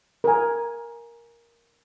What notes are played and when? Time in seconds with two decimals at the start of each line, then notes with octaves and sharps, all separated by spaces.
0.24 A#4 G#5